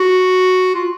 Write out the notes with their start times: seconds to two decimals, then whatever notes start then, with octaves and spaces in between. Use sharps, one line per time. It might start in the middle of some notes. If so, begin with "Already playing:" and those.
Already playing: F#4
0.74 F4